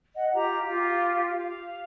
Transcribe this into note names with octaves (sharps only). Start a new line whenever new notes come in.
D#5 F#5
F4 G4 A#5
F4 G4
F5